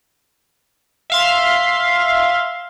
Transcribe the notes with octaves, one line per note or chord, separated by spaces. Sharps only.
E5 F5 C6